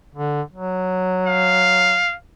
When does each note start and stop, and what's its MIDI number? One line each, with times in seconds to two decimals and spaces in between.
0.15 0.42 50
0.53 2.01 54
1.27 2.15 77